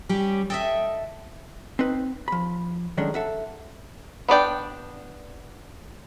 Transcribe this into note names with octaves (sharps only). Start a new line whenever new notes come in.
G3 C#4 G4
A4 D#5 E5 G5
C4 D#4 B4
F3 B5
D#3 F#3 G#3 A3 C#4 D4
A4 E5 F#5
B3 D4 D5 G5